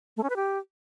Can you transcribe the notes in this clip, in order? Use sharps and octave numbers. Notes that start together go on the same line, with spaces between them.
A3
C#4
B4
G4